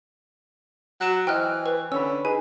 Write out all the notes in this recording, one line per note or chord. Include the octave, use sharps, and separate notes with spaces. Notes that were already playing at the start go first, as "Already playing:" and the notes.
F#3 F#6 E7
E3 C5 D#5 G5 F6 F#6
B4
D3 C#4 C#5 B5 E6
D#4 G#4 B4 G#5